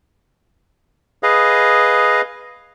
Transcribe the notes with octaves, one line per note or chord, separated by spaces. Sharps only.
G#4 B4 D#5 F5